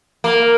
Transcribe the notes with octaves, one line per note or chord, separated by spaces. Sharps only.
A#3